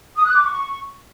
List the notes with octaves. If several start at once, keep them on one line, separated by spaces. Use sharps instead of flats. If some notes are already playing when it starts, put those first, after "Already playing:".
D#6
F#6
D6
C#6